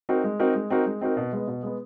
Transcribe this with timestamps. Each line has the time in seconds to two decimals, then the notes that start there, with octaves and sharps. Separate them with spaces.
0.09 C4 D#4 F#4 A#4
0.24 G#3
0.40 C4 D#4 F#4 A#4
0.55 G#3
0.70 C4 D#4 F#4 A#4
0.86 G#3
1.01 C4 D#4 F#4 A#4
1.17 B2
1.33 G#3 B3
1.48 B2
1.63 G#3 B3